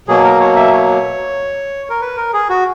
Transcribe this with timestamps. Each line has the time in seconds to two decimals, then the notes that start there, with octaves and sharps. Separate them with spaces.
0.08 B2 F#3 A#3 G#4
0.24 A#4
0.40 C#5
0.56 E5
0.72 C#5
1.90 A#4
2.02 B4
2.17 A#4
2.33 G#4
2.50 F#4